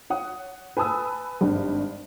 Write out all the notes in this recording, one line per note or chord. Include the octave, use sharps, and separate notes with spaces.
C#5 F#5 D#6
B4 G#5 A5 D#6 E6
G#1 G2